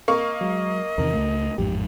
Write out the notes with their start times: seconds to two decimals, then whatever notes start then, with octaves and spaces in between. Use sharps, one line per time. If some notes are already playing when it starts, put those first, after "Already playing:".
0.08 A#3 D#5 F5 C#6
0.41 F#3 G#3
0.98 E2 C3 D#3 A#4
1.14 C#2 A3
1.58 A1 F2 G#2 G4